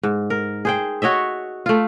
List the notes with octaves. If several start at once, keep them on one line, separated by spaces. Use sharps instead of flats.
G#2
A#4
G#4 C5 G5
F#4 C#5 D#5 E5
A3 F4